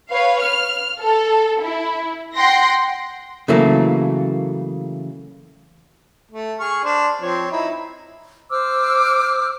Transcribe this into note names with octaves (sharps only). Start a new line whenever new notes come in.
B4 C#5 F5
F6
A4
E4
F#5 G5 C6 A#6
C#3 E3 F#3 A3 A#3
A3
G#4 C#6 F6
D4 C5
F3 C4 C#5
D#4 E4
C5 D6 E6 F6